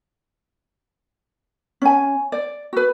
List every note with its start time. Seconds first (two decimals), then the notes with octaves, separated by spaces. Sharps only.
1.82 C#4 G#5
2.32 D5
2.73 F#4 B4